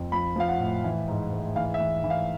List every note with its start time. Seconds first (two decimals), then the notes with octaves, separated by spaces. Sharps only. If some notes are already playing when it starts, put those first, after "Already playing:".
Already playing: F2
0.12 F3 B5
0.36 F3 F5
0.48 F#5
0.60 A2
0.84 E3
1.08 G#2
1.32 G#2
1.56 E3 F5
1.74 E5
1.80 E3
2.04 E3
2.10 F5